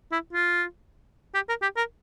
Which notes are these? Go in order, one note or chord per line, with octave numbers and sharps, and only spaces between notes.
E4
F4
G4
A#4
G4
A#4